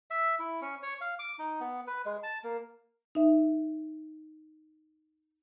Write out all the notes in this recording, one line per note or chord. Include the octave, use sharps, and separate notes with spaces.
E5
E4
C#4
C#5
F5
D6
D#4
B3
B4
G#3
A5
A#3
D#4 E5